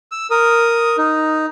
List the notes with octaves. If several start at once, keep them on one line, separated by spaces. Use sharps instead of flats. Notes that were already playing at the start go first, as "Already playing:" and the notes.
E6
A#4 D#6
D#4